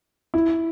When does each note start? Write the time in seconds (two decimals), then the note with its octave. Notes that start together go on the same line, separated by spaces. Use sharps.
0.34 E4